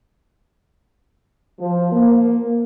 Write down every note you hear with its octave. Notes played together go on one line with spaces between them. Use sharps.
F3
A#3